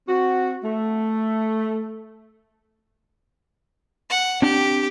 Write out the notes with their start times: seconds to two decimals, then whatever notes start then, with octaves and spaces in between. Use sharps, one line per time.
0.09 C4 F#4
0.64 A3
4.09 F#5
4.42 C4 D4 G4